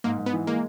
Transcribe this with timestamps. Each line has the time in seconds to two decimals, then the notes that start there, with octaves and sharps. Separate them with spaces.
0.04 G#2 A#3
0.19 G#2
0.26 B3
0.33 E3
0.47 G#3 A#3